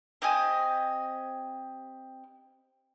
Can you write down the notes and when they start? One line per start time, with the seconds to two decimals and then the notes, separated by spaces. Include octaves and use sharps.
0.22 C4 G4 D#5 G#5